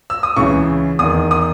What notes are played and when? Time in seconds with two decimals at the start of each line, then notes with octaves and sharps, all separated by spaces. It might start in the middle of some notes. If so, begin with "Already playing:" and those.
0.10 E6
0.23 D#6
0.36 C#2 C#3 E3 C#6
0.99 E2 D#3 D#6
1.31 D#6